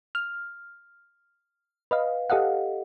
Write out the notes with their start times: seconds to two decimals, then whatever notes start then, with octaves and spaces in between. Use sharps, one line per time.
0.15 F6
1.91 B4 D#5 F5
2.30 G4 A4 D#5 F5 F#5